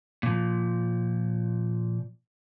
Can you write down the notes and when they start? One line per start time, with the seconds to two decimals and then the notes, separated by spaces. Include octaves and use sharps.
0.23 A#2 F3